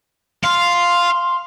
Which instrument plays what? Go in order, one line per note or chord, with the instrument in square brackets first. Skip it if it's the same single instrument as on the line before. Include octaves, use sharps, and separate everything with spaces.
[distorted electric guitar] F5 [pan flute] C6